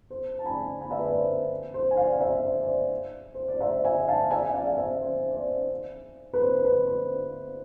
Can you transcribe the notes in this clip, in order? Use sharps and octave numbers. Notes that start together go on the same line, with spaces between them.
C5
A5
G#5 B5
G#5 B5
E5
B4 D5
B4
C5
C5
G#5
D5 F5
C5 E5
C5
D5
C5
C5
D5
C5 E5
E5 G#5
F5 A5
E5 G#5
G#5
D5 F5
F5
C5 E5
C5
D5
C5
B4
C5
B4
C5